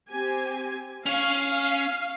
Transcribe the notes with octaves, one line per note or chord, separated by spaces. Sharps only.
C4 G4 G#5
C#4 C#5 F5